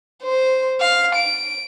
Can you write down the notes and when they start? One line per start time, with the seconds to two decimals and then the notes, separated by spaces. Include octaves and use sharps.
0.23 C5
0.80 F5
1.15 D7